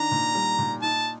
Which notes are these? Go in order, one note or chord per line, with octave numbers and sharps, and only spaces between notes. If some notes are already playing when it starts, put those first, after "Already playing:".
Already playing: D#3 D4 A#5
A#2
G3
A#2
D#4 A5